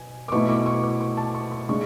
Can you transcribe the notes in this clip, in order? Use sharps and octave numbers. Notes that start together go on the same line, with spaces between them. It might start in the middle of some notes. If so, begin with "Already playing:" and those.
Already playing: B2 G#5
D6
B2 A3 E4 C#6
D6
C#6
D6
C#6
A5
C#6
C#6
C#3 G#3 D4 C#6